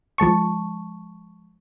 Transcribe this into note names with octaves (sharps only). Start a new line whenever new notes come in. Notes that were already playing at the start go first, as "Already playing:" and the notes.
F3 G#3 A5 C#6